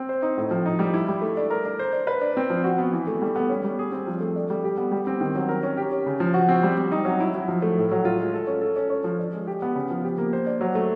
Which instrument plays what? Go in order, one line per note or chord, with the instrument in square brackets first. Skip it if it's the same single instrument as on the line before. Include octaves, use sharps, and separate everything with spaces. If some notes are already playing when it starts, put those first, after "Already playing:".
Already playing: [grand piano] C4
C5
D#4
A2
F3
D#4
G3
E4
G3
A3
D4
A#4
D4
C5
D4
B4
D4
C4
F3
F#4
B3
E3
A3
G3
B3
C#4
G3
G#4
C4
F3
A3
D4
G3
G4
B3
G3
C4
D#3
F#3
A#4
C#4
G4
C#4
C#3
F3
F#4
C4
G3
C4
D#4
F#3
E4
F#3
F3
A3
A2
F#3
F4
G#3
A4
C#4
A4
C#4
C#4
F3
D4
G#3
G4
B3
C#3
F3
G4
A#3
C5
D4
F#3
A3